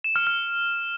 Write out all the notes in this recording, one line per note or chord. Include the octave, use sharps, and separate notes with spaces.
E7
F6
F6